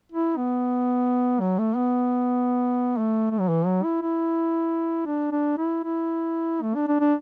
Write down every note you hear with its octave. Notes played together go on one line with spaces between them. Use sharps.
E4
B3
F#3
A3
B3
A3
A3
F#3
E3
F#3
E4
E4
D4
D4
E4
E4
A3
D4
D4
D4